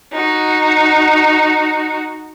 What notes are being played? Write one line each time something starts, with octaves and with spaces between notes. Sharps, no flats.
D#4 F#4